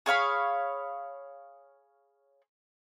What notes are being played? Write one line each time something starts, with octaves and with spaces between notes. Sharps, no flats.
G#4 C#5 F5 B5